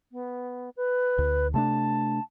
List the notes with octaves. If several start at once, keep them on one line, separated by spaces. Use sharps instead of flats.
B3
B4
D2
C3 A3 D4 A5